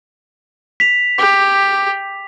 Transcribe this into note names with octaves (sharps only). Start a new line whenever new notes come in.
B6 F7
G4